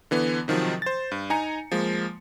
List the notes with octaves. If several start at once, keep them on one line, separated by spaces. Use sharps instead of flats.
D3 E3 B3
C3 D#3 F3 F#3
C5 A6
G2
D#4 G#5 A#5 C#7
F3 G#3 A#3